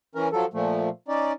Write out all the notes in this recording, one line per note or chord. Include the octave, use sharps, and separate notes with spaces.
E3 C#4 A#4
F3 F#3 A4
A#2 F3 A3
C#4 D#4 D5